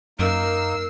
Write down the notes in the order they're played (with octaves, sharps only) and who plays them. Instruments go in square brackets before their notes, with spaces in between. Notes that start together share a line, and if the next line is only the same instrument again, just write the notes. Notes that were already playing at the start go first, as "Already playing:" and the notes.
[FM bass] F#2 [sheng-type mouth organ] A#3 D#4 [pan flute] A#4 [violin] E6 C7